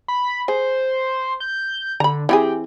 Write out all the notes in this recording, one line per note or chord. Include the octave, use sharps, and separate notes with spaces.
B5
G#4 C5
G6
D3 A#5 B5
E3 C4 G4 G#4